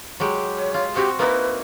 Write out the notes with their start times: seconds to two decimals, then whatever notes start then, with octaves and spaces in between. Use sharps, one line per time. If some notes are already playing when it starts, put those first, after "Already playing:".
0.20 F#3 G#3 G4
0.58 C#5
0.74 F4
0.96 C4 F#4 G4
1.19 A#3 D#4 E4 B4